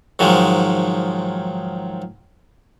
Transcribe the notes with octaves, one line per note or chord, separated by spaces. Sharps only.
G#2 D#3 F3 F#3 G#3